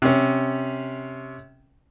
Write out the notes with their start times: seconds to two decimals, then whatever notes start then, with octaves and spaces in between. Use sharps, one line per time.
0.02 C3 C#4